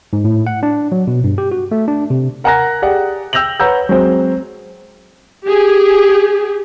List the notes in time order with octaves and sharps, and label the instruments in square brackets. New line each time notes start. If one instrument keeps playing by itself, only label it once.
[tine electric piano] G#2
A2
F#5
D4
F#3
B2
G2
G4
F#4
A3
D4
C3
[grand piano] A#4 F#5 G#5 A#5 F#6 A#6
G4 G#4 D5 F#5
G5 E6 G6 A#6 F7 F#7
B4 C#5 F#5 A#5 E6 G6
F#3 G#3 C4 C5
[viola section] G4 G#4